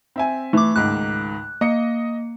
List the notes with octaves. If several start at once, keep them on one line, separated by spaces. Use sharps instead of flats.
C4 E5 G#5
E3 A3 D6
C#2 G#2 D#3 F#6
A#3 D#5 C#7